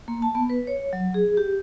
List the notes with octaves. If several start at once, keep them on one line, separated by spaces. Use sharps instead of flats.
A#3
A5
B3
B4
C#5
F#3
G#4
G4